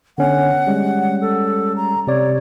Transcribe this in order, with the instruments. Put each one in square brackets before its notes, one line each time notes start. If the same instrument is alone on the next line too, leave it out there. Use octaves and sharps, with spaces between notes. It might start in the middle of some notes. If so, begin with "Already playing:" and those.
[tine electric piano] D3 B3 C#4 [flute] F#5
[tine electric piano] G3 G#3 C#4
[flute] A4
A#5
[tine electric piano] C3 D5 [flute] C#5